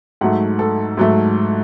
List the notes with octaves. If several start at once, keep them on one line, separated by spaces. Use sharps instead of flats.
G#2 F#3 A3 F#5
A4
G#2 F#3 A3